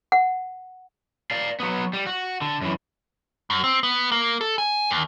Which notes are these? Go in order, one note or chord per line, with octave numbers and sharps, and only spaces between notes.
F#5
D5 F5
F#3 B3
G3
F#4
D3
F#2 E3
F#2
C4
B3
A#3
A4
G#5
D#2